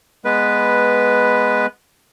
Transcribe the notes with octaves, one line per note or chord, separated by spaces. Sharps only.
G#3 B3 B4